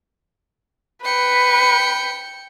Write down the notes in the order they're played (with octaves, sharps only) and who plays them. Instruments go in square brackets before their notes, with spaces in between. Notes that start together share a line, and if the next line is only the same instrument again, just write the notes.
[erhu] B4 [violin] G5 C#7